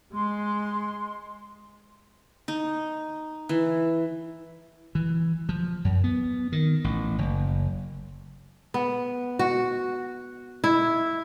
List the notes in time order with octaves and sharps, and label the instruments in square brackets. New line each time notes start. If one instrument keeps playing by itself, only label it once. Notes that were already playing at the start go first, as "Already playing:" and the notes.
[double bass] G#3 [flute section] C6
[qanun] D#4
E3
[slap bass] E3
F3
F#2
B3
D#3
A1
F#1
[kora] B3
F#4
E4